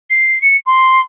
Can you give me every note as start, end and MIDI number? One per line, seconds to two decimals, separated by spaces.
0.10 0.41 96
0.42 0.57 97
0.66 1.01 84